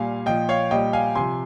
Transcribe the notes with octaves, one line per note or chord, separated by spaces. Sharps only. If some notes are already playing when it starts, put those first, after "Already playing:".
Already playing: A#2 G3 F5 G#5
A#2 F3 D#5 G5
C#5 F5
A#2 G3 D#5 G5
F5 G#5
C3 F3 G#5 C6